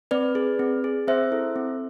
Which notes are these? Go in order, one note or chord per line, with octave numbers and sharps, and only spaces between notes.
C4 B4 D5
G#4
C4
G#4
C4 C5 E5
E4 A4
C4